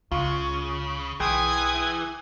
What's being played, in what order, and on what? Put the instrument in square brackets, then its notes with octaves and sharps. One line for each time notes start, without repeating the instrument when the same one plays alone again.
[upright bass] C#2 [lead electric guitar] C#3 [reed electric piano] F4 C#6
[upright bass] B1 [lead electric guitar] E3 [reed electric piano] G#4 G5 C6 [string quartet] G#5 D#6 G#6